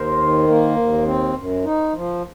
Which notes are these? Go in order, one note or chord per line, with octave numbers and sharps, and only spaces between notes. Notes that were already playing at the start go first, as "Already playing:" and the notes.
Already playing: D#2 A#4 C5
D#3
A#3
D#2
C4
F#2
D#4
F3